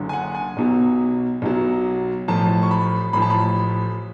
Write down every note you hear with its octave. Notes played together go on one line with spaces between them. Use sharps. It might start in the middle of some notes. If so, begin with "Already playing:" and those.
Already playing: F#1 F#2 D3
G#5
F#5
G#5
B1 B2 F#3
B1 B2 F#3
A1 A2 F3 A5
C#6
B5
A1 A2 F3 B5
A5
B5